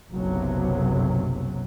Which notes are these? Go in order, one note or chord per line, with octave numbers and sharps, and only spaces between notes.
F#1 B1 C3 F#3